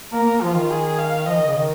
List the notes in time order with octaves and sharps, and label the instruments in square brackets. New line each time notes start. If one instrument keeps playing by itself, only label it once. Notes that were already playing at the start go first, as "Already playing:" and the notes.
[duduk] A#3 [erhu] A#4
[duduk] A#3
[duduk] F3 [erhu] F4
[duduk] D#3
[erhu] G#4
F5
[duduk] F3 [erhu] D#5
[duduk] D#3
C#3
D#3